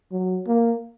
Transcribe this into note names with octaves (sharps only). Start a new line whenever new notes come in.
F#3
A#3